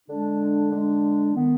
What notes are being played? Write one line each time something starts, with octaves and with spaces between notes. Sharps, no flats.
D3 G#3 D4
D3 G#3 D4
D#3 B3